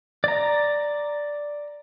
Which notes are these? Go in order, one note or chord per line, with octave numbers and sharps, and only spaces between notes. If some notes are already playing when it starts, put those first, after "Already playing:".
D5 A#5